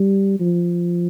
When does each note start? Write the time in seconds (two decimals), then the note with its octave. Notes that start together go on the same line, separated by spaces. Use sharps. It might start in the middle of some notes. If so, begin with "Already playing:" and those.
Already playing: G3
0.40 F3